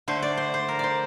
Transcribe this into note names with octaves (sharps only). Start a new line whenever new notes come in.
D3 A3 C5
D5
C5
C5
A#4
C5 D5